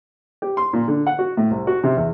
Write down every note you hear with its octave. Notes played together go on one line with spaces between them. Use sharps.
G4
C6
A#2
D3
F#5
F#4
A2
C2
F#4
C3
E2